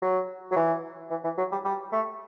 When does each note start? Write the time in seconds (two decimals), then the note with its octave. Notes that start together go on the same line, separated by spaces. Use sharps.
0.02 F#3
0.52 F#3
0.56 E3
1.11 E3
1.24 E3
1.38 F#3
1.52 G3
1.65 G3
1.92 A3